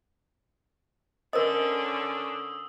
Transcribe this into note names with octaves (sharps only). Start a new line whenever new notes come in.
D3 C#4 A#4 C5 D#5 D#6 E6